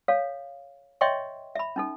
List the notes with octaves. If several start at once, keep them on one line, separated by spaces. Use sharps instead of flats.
A4 C#5 F5
C#5 D#5 E5 G5 C6 C#6
E5 B5
C#4 D#4 A4